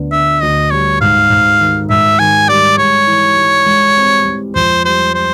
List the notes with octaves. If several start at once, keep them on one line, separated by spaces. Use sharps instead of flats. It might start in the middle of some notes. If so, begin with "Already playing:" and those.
Already playing: D2 D3 B3
D3 E5
D2 D#5
G3 C#5
G#2 F5
G#2
D#3
G#2 E5
D#3 G#5
G3 D5
G#3 C#5
E3
G#3
G#3
C4
G#3
F2 C5
G3 C5
G3 C5